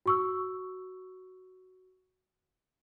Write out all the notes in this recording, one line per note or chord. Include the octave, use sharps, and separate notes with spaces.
F#4 C#6 E6